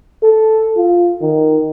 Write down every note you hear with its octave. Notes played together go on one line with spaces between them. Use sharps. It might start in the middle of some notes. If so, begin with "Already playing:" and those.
A4
F4
D#3